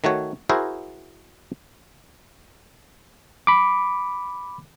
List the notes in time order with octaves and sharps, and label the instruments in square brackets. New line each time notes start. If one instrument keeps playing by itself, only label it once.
[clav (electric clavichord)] D#3 A3 F#4 C#5
E4 F#4 G#4 A#4 C5
[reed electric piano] B5 D6